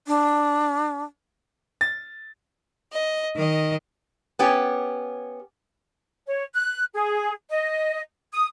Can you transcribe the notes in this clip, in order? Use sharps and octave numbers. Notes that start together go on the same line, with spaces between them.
D4
A6
D#5
D#3 D#5
B3 C#4 G4
C#5
F#6
G#4
D#5
D#6